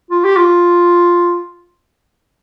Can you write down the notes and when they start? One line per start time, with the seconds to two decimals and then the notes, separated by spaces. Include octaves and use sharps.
0.11 F4
0.24 G4
0.37 F4